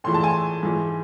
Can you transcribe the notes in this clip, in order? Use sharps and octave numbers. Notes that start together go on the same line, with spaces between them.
A2 E3 G#3 C6
A5
G#5 C6
G#2 E3 G#3